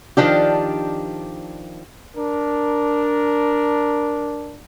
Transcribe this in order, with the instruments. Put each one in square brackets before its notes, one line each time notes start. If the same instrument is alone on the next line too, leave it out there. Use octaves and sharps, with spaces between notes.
[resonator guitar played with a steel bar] D#3 F3 D4 G4
[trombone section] D4 A#4